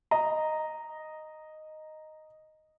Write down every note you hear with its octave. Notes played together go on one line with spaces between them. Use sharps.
D#5 A#5